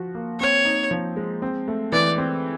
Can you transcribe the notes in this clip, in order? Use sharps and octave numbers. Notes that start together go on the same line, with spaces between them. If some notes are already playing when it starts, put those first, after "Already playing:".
Already playing: F3 F#4
A#3
C4 C#5
D#4
F3
G#3
C4
A3
E3 D5
C4